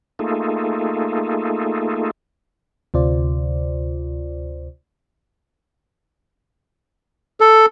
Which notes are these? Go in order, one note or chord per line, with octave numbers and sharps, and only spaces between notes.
A3 A#3 D#4 F4 G#4 A4
D2 C3 F4 C5 D5
A4